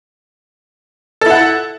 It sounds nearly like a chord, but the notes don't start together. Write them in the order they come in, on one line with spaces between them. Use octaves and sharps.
A4 E4 F#5